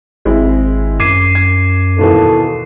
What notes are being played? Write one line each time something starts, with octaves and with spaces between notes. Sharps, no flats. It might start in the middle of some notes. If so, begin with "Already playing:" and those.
G#1 G#3 C4 E4
F#2 D6 G#6 C7 D#7
G#6
D#2 B2 E3 A4